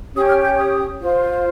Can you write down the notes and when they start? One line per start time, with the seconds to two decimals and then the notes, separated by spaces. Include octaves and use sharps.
0.14 C#4 G4 C#5 D#6
0.29 F6
0.43 G6
0.57 D#6
0.99 F4 C5